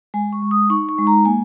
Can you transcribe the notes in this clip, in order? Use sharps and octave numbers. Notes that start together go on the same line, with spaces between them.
G#3 G#5
C#6
G#3
D#6
D#4 C#6
C#6
G#3
A#5
A#3 G#5